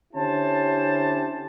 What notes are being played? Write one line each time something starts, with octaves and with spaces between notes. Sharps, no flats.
D3 C#4 E4 G4 C5 A5